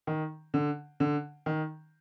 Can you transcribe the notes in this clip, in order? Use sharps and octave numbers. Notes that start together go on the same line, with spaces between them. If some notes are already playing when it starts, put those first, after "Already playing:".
D#3
D3
D3
D#3